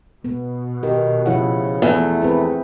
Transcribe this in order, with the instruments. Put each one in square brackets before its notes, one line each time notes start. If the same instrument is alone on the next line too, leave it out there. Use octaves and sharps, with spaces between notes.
[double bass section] B2 [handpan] B3
[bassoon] D#3 [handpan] G4
[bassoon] C#3 [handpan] F3 E4 F#5
[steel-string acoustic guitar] E2 [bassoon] A3
[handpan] C4 G#4 B4